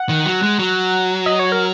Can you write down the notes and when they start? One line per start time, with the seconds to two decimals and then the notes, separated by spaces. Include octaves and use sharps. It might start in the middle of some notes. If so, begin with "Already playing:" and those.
Already playing: F#5
0.09 D#3
0.26 F#3
0.42 G#3
0.59 F#3
1.26 D#5
1.39 C#5
1.52 A#4